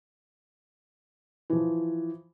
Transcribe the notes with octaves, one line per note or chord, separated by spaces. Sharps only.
E3 F3